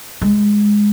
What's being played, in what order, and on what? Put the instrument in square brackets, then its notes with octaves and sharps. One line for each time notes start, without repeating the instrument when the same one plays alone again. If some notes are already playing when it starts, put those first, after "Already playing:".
[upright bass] G#3